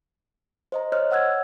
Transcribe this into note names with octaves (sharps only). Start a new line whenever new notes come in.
C5 D#5 A#5
C5 C#5 D#5 F6 F#6
C#5 F#5 E6 F#6 G#6